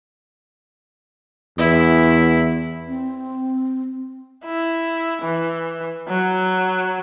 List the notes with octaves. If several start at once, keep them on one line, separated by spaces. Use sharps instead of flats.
E2 E4
C4
E4
E3
F#3